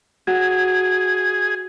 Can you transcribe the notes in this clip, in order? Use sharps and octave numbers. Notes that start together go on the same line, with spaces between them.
F#4 G#4